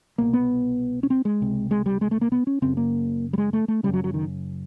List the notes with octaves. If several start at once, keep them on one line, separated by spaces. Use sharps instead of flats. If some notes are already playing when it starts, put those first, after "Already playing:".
C2 B2 A#3
B3
C#4
C4
G#3
C#2 C3
G#3
G3
G#3
A3
A#3
B3
C#4
F#2 C#3 C4
A#3
G3
G#3
A3
A3
F#2 C#3 G3
F#3
F#3
D#3